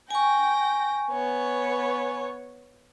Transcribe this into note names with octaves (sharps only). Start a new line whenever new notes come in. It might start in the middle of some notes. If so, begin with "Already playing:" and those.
G5 G#5 C#6 A#6
B3 C#5